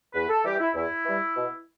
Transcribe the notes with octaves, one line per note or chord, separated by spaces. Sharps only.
E2 B4
A4
E3 G3 G4
E4
E2 E4
E3 G3
B2